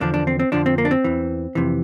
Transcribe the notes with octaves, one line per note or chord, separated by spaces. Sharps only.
E2 D3 F3 D4
D4
C4
C4
F2 D3 F3 D4
C4
A#3
D4
C4
E2 E3
F2 C3 E3